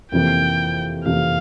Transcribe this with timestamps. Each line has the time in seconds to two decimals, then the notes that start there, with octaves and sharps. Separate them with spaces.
0.12 F2 C3 E3 A#3 G5
1.05 F2 C3 E3 A#3 F5